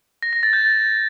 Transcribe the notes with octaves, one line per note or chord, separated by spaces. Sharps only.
A#6
A#6
A6
G6